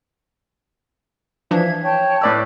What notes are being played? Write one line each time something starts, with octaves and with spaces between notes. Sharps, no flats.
E3 F3 D4 E5 F5 G#6
C#5 G5 A5
A2 B4 D5 B5 E6